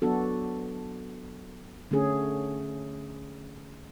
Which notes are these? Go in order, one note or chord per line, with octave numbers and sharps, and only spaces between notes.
F#3 B3 D4 F#4 A4
D3 A3 C#4 G#4